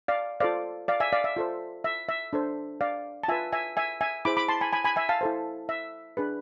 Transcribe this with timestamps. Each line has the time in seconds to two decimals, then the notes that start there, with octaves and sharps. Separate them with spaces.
0.08 D5 F5
0.40 F4 A4 C5 D5 F5
0.88 D5 F5
1.00 E5 G#5
1.13 D5 F5
1.24 E5
1.36 F4 A4 C5
1.84 E5
2.09 E5
2.33 D4 A4 C5
2.81 D5 F5
3.23 A5
3.28 F4 B4 E5 G#5
3.52 E5 G#5
3.77 E5 G#5
4.01 E5 G#5
4.25 E4 G#4 C5 B5 D6
4.37 B5 D6
4.49 A5 C6
4.61 G#5 B5
4.73 G#5 B5
4.85 G#5 B5
4.96 E5 G#5
5.09 F5 A5
5.21 E4 A4 C5
5.69 E5
6.17 D4 G#4 B4